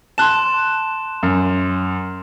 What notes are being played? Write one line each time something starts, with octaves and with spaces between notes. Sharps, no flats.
A5 C6 F#6 E7
F#2